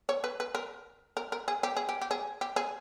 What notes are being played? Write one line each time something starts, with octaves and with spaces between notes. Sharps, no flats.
C#5
B4
B4
A#4
A#4
A#4
G#4
G4
G#4
G4
G4
G#4
G4
G#4